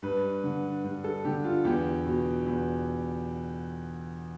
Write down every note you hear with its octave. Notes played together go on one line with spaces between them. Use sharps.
G2 B4
D3
G2
A4
D3 G4
F4
E2 G4
B2
E2